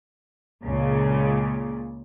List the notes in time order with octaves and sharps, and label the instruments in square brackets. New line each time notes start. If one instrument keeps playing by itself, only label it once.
[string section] C#2 A#2 C#3